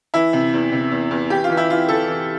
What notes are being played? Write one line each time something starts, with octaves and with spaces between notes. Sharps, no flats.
E3 E4
C3
E2
C3
E2
E2
E3 G4
F4
E3
E4
E3 F4
E3 A4
E3